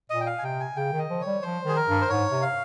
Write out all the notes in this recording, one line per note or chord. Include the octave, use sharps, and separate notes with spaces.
A#2 D#5
G5
F5
G#5
C3 G5
G#5
C#3 G5
D#3
D#5
F3
C#5
G3
F3 C5
D#3 G#4
A#4
G2
C5
G#2 C#5
C3
F5